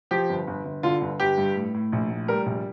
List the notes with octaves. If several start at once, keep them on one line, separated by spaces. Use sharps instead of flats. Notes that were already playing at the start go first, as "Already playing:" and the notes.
F3 G4
G1
G1
G1
D3 F4
G1
G1 G4
G2
A2
A2
A#1
A2
G3 A#4
A#1